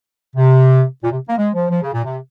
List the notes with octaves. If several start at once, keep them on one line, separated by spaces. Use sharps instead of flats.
C3
A#2
C3
A#3
G#3
F3
F3
C#3
A#2
C3